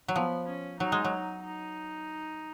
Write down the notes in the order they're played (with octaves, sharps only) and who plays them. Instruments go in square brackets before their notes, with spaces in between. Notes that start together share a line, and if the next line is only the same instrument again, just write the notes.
[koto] F#3
[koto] F3 [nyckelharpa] B3
[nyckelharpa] C#4
[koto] F#3 [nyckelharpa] D#4
[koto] G#3
F#3
[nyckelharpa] D#4
D#4